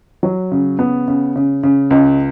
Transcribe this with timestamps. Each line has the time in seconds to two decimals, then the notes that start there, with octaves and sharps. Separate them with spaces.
0.23 F#3
0.52 C#3
0.79 B3
1.08 C#3
1.36 C#3
1.63 C#3
1.91 C#2